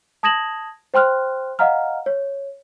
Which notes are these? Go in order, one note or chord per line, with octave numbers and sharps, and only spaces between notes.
A5 D#6 G#6 A#6 E7 F#7
C5 G5 C6 F6 F#6
D#5 F5 F#5 A#5 F6
C#5